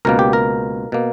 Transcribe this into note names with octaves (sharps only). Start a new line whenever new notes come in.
C#2 B2 A#3 A#4
G4
A#4
B2 A#3